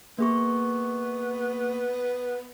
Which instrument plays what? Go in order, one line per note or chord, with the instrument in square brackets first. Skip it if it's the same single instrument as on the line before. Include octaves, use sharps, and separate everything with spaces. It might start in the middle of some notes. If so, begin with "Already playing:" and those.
[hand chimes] A#3 G#4 C#6 [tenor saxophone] B3